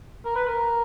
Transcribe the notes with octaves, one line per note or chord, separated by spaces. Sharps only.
A#4
B4
A#4